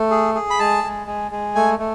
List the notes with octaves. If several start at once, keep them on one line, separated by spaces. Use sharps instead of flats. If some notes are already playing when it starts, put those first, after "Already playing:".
Already playing: A3
G#4
G#4
B5
G#3 A5
G#3
G#3
G#3
A3 G#5
A3